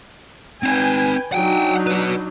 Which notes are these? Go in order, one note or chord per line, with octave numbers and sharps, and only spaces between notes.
C4 D#4 B4 G5 G#5
F#3 D4 D#4 F#5 G5
F#4 B4